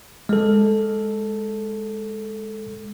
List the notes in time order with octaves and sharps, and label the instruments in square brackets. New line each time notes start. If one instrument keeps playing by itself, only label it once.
[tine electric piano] G#3 A4